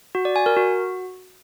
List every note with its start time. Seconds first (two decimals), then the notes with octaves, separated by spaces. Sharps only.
0.15 F#4
0.25 D5
0.36 G#5
0.46 A#4
0.57 F#4